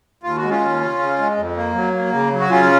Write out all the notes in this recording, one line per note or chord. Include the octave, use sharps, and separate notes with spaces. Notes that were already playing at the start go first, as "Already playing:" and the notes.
D#2 F4
F#4
G#3
C#4 F4
D#2
C#3
C#3
G#3
F2
A#3
F#3
A#3
C#3
F#3
F#4
C#3 C#4 F4